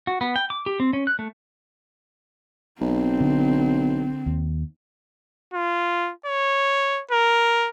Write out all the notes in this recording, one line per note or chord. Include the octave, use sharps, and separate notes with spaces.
F#4
B3
G5
D6
G4
C4
C#4
F#6
A3
B1 C4
D3
D#2
F4
C#5
A#4